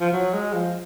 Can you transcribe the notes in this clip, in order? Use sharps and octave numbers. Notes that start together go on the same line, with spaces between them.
F3
F#3
G#3
F3